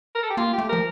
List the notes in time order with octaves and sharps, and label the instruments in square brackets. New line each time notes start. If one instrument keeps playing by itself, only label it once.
[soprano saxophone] A#4
A4
G4
[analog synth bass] A#3 [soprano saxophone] F4
[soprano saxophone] G4
[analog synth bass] A3
[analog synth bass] F3 [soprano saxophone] A#4